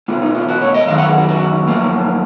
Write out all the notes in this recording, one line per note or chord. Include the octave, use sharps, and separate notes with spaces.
B2 G#3 F4
D#4
F4
F#4
C#5
D#5
F#2 D#3 G#3 F5
F#5
G#4
F#4
F#4
F#2 F3 A#3